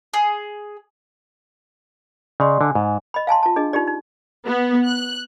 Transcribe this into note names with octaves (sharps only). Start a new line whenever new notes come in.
G#4
C#3 D5 D#5 C6
D3 G#5
G#2
D#5 B5
F5 G#5 A5 C6
F4 A5
D4 G#4 D#5
D#4 F4 G4 D5
D#4
B3
F#6